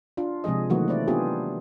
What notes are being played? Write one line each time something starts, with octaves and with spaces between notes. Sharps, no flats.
D4 F4
C3 F3 G#3 G#4 D#5
D#3 E3 F#3 A3 A#3 F#4
A3 C4 E4 D5
B3 D4 F4 G4 G#4